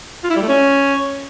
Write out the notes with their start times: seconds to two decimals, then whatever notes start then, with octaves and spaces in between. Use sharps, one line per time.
0.24 F4
0.30 E4
0.36 G3
0.42 A3
0.48 C#4